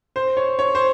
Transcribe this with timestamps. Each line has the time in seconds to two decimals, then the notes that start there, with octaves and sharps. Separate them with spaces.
0.16 C5
0.37 C#5
0.59 C#5
0.75 C5